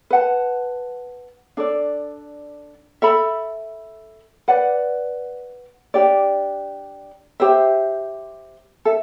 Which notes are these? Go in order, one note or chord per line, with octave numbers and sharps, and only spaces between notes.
B4 F#5 A5
D4 A4 D5
A4 E5 B5
B4 D5 F#5
D4 G4 D5
G4 C5 E5
A4 E5